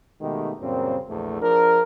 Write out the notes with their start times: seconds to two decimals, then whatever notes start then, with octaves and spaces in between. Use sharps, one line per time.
0.21 B2 D#3 G#3 A3 B3 G4
0.60 F#2 A#2 C#3 G3 C4
1.07 A#1 E2 A3
1.41 F3 D4 G#4 A#4